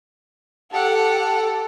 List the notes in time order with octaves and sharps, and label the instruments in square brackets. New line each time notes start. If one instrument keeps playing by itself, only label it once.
[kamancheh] G4 F#5 [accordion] A4